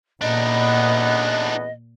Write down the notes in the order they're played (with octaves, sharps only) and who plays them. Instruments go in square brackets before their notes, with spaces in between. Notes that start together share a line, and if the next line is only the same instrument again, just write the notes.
[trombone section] A1 E2 B3 [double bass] A#2 [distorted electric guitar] D4 D#4 [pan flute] D#5